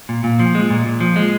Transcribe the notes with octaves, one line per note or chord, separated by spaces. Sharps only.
A#2
A#2
F3
G#3
A#2
A#2
F3
G#3